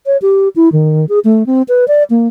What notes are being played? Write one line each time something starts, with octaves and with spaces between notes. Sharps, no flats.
C#5
G4
E4
D#3
G#4
A3
C4
B4
D5
A#3